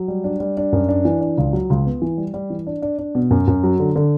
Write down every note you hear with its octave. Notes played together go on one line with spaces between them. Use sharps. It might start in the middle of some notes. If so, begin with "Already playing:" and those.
Already playing: F#3
G3
D4
G3
D4
F#2
D4
E3
D4
C#2
F#3
C#2
B3
E3
G3
G3
E3
D4
D4
D4
B2
F#2
F#2
F#3
D3
D3